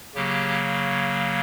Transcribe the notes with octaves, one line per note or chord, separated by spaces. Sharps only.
C#3 F#3 A#3 G4